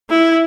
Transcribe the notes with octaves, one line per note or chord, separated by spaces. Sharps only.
E4